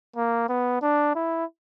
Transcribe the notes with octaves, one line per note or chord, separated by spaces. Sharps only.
A#3
B3
D4
E4